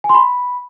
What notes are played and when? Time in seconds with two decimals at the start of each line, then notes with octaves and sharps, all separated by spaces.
0.04 G#5
0.09 C6
0.15 B5